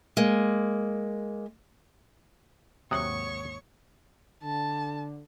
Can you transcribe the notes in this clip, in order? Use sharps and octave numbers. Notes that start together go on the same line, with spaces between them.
G#3 A#3
D#2 G#2 C3 F#3 C#5 F#5 C#6 D#6
D3 A5